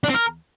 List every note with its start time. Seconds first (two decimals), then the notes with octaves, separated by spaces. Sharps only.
0.04 D4
0.09 C4
0.14 A#4